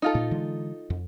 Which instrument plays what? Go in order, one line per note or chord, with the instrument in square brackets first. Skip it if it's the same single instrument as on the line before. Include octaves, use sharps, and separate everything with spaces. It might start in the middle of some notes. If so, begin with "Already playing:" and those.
[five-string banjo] D#4 F4 A4
[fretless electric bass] A#2
D3 E3 G#3
F2